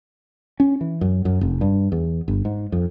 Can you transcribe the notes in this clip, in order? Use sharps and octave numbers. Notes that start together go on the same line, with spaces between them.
C#4
E3
F#2
F#2
F1
G2
E2
G1
G#2
F2